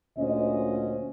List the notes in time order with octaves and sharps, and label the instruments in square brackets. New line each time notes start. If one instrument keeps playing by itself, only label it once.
[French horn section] D2 A#2 C#4 C5 D#5